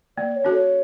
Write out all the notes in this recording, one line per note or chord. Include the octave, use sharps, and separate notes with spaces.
A#3 D5
C#5
C#4 F#4 A4
C#5